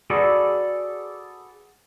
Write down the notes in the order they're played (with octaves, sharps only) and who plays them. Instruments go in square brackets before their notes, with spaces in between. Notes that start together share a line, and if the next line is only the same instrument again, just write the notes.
[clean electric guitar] F#4 G#4 A4 B4 D5